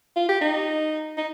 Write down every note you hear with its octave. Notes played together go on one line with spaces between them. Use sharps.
F4
G4
D#4
D#4